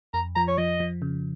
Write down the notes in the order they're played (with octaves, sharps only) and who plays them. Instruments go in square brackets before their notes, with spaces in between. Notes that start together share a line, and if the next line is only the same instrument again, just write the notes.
[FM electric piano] F2 [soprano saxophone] A#5
[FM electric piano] F3 [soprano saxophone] A#5
[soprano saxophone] C#5
[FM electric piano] F3 [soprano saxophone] D#5
[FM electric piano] F3
C#3